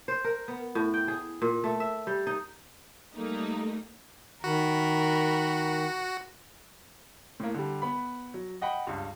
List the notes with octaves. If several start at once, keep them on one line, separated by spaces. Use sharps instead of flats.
C5
A#4
B3
A2
G5
G#4
A#2
A3
E5
G3
D#4
G3 A3 A#3 D#4
D#3 F#4 A#4 B5
A2 A#3
D3 G3
B3 B5
F#3
D#5 F#5 G5 B5
C#2 G2